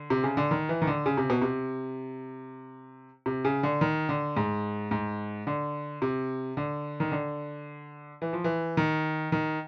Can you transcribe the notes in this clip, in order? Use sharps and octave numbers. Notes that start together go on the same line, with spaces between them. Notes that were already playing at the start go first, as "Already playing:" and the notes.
Already playing: D3
C3
C#3
D3
D#3
E3
D#3
D3
C#3
C3
B2
C3
C3
C#3
D3
D#3
D3
G#2
G#2
D3
C3
D3
D#3
D3
E3
F3
E3
D#3
D#3